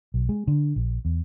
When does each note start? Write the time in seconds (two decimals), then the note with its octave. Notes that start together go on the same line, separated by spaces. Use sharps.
0.14 B1
0.29 G#3
0.47 D3
0.76 A#1
1.05 E2